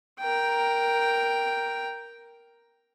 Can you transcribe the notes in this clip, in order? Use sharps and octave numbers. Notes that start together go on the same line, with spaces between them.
A#4 G5